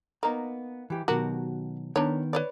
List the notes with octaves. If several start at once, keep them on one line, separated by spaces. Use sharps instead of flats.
A#3 B3 D#4 A#5
E3 G4
B2 D#3 F#3 F#4 G4 A#4
D#3 B3 D4 A#4 C#5
B4 C#5 D5